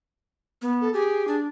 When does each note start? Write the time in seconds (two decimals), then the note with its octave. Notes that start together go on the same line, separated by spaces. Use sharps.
0.62 B3
0.81 A4
0.93 G4 G#4
1.28 D4